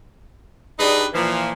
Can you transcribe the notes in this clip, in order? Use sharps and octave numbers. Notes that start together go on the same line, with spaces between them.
G2 G3 D4 D#4 G#4 B4
A#2 E3 F3